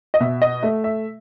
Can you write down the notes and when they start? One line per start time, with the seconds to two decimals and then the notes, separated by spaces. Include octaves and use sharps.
0.14 D#5
0.20 B2 E5
0.42 D#5
0.63 A3 E5
0.84 E5